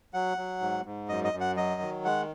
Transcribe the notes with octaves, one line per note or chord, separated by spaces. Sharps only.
F#3 F#5
F#3
G#2
G#2
F#2 D#5
D#5
F#2
F#5
F#3 D#5
D#3
G#3 F#5